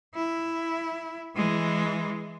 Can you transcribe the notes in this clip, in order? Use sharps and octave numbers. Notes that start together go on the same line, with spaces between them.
E4
E3 G#3